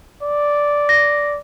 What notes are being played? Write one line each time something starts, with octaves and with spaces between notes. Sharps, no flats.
D5
A#6